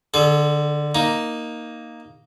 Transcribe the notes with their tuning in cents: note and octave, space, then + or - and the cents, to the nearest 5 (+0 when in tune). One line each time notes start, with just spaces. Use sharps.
D3 +15 A4 -45
A#3 +0 D#4 +0